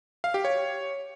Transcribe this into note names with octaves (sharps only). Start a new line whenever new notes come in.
F5
G4
C#5